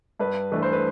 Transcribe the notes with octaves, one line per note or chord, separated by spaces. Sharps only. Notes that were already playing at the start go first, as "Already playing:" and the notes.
G2 B4
E3 A3 D4 B4
C5
B4